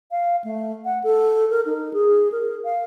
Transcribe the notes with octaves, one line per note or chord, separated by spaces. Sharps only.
F5
A3
F#5
A4
A#4
D#4
G#4
A#4
F5